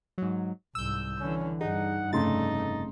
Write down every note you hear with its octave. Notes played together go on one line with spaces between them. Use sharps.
G#2 F#3
C2 G#2 E6 G6
D3 E3 C#4
G2 D#4 G#4 F#5
F1 G2 C#3 A3 D#4 C6 A6